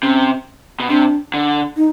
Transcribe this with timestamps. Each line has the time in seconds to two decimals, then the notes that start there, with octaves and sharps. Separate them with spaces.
0.03 C3 C#4
0.80 B2
0.90 C3 D4
1.34 D3
1.77 D#4